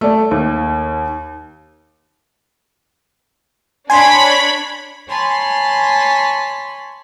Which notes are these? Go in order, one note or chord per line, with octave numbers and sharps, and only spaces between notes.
A3 D5
D#2
D4 C#5 G#5 B5 C6
C#5 G#5 A5 B5 C6